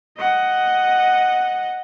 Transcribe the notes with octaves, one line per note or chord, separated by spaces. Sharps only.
D#5 F#5